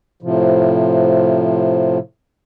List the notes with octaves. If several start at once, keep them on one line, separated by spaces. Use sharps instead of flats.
A2 C3 F3